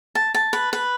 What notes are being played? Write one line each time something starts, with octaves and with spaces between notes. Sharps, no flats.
A5
A5
B4
B4